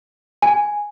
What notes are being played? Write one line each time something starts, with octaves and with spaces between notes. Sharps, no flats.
G#5